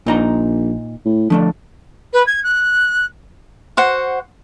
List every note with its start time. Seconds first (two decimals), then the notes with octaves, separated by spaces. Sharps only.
0.06 A#1 A#2 D#4 A#5
1.06 A2
1.30 D3 F3 A3 D4
2.13 B4
2.27 G#6
2.44 F#6
3.77 F#4 C5 F#5